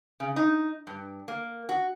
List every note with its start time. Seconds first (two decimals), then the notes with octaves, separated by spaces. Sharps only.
0.20 C#3
0.36 D#4
0.87 G2
1.28 A#3
1.69 F#4